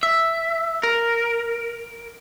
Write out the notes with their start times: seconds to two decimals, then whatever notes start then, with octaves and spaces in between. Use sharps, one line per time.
0.03 E5
0.83 A#4